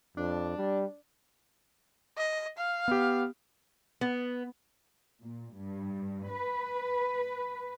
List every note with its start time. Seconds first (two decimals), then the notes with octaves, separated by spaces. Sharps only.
0.17 F2 D4
0.57 G3
2.17 D#5
2.57 F5
2.88 B3 G4
4.01 B3
5.23 A#2
5.55 G2
6.31 B4